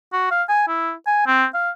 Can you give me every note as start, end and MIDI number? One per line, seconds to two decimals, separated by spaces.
0.13 0.30 66
0.31 0.43 77
0.49 0.64 80
0.68 0.92 64
1.07 1.22 80
1.27 1.45 60
1.54 1.70 77